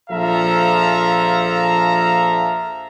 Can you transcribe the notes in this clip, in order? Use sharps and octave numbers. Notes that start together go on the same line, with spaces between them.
A#1 F3 A4 E5 F5 A#5